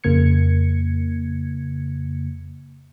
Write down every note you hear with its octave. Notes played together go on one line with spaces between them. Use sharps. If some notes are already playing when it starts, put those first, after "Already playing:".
F2 C#3 A#3 G#6 C#7